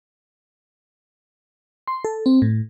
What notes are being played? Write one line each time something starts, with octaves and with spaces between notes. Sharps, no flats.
C6
A4
C4
A2